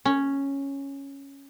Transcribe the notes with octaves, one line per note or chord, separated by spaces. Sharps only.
C#4